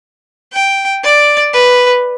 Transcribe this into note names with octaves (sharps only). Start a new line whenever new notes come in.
G5
D5
B4